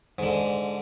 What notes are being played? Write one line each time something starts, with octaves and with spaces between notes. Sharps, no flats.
G#2 D3